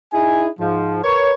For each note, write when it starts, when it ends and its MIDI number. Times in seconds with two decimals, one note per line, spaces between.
0.13 0.47 63
0.13 0.47 64
0.13 0.47 68
0.13 0.47 80
0.60 1.04 44
0.60 1.04 53
1.04 1.33 70
1.04 1.33 71
1.04 1.33 73